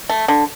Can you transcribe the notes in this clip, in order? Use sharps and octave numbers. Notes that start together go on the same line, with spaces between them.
A3
D3